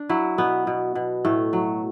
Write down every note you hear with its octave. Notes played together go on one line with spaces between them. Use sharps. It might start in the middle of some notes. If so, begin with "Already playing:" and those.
Already playing: D4
F#3 E4
B2 B3
B2
B2
A2 A3
F#3